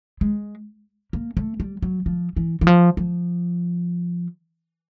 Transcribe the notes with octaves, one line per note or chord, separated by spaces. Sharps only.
G#3
A#3
A3
G3
F#3
F3
E3
E3
F3
F3